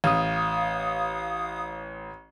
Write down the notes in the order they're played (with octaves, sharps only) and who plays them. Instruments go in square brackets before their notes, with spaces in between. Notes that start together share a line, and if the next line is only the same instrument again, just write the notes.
[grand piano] A1 [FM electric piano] F5 D#6